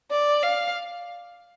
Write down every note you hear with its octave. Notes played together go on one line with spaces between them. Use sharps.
D5
F5